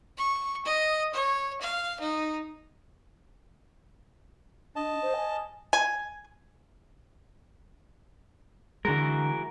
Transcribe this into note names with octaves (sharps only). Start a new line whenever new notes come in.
C#6
D#5
C#5
F5
D#4
D4 D#5 A5
C5
G#5
G#5
D3 E3 G#3 F#4 A#4